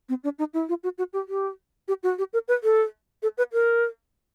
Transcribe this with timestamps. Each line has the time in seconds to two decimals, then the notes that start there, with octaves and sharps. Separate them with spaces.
0.09 C4
0.24 D4
0.39 D#4
0.54 E4
0.69 F4
0.84 F#4
0.98 F#4
1.13 G4
1.29 G4
1.88 G4
2.03 F#4
2.18 G4
2.33 A#4
2.48 B4
2.63 A4
3.23 A4
3.38 B4
3.53 A#4